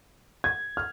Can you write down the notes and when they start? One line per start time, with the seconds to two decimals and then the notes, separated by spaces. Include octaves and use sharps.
0.44 G#6
0.77 F6